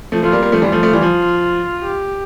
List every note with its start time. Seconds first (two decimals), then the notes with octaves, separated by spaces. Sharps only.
0.12 F3 A3
0.23 F3 A3 F4
0.32 G3 A#3
0.43 G3 A#3
0.52 F3 A3
0.62 E3 G3 F4
0.72 F3 A3
0.83 F3 A3
0.93 E3 G3
1.02 F3
1.83 G4